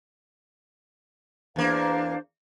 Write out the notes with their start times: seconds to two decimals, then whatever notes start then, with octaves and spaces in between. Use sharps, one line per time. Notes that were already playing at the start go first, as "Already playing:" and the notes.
1.56 E2 A#3 D4 C5 F5